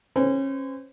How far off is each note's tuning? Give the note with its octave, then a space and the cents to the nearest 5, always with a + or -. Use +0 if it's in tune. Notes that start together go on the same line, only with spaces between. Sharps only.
C#4 -30 C5 -35